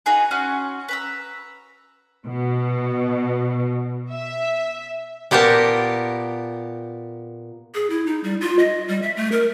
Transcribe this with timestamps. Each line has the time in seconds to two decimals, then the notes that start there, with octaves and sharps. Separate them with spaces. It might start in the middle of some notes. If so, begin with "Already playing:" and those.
0.06 D#4 F#4 G#4 B4
0.31 C#4 F#4 C6
0.88 B4 A#5 E6
2.25 B2
4.12 E5
5.31 A#2 B3 G4 A#4 A5
7.74 G#4
7.90 E4
8.06 D#4
8.24 G3
8.41 F4
8.59 D#5
8.88 G3
9.02 E5
9.17 A3
9.32 A#4